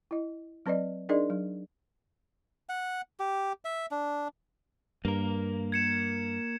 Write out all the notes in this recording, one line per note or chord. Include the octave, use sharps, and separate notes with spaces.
E4 D#5
F#3 C4 B4 D5 D#5
D4 D#4 G#4 A#4 D5 D#5
F#3
F#5
G4
E5
D4
G2 A#3 A#4
G#6 C#7 E7